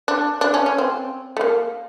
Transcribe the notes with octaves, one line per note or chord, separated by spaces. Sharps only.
D4
D4
C#4
C#4
C4
A3
A#3